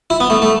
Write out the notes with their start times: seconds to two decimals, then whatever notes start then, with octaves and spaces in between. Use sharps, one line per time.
0.10 E4
0.20 B3
0.30 A3
0.42 A3